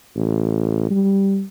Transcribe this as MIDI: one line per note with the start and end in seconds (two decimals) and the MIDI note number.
0.16 0.89 33
0.90 1.43 55